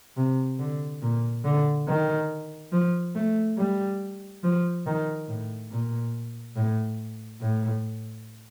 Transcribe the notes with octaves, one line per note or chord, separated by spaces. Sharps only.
C3
D3
A#2
D3
D#3
F3
A3
G3
F3
D#3
A2
A#2
A2
A2